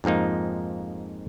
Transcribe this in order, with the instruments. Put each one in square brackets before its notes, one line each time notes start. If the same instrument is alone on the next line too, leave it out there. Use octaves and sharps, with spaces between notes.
[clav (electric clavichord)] F2 G#2 F3 A#3 D#4